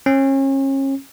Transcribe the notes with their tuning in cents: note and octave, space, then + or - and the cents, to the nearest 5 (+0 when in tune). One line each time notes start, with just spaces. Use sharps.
C#4 -35